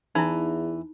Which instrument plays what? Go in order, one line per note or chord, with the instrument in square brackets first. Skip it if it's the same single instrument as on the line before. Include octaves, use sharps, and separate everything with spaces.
[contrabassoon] E2 [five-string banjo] E3 [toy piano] D#4 E4